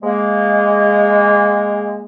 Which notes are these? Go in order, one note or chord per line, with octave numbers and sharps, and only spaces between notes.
G#3 A#3